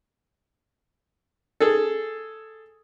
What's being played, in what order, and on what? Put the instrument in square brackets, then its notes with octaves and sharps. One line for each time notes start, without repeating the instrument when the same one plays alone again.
[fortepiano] G#4 A4